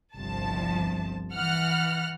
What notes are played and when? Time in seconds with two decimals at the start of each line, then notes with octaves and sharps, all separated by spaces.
0.18 G1 C2 F3 A5
1.32 E3 F#5 F6 F#6